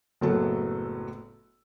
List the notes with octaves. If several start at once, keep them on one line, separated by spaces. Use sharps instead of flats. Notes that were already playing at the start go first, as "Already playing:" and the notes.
F#1 A2 F#3 B3 A4